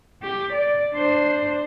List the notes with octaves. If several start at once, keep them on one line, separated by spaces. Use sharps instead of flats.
G4
D5
D4 C5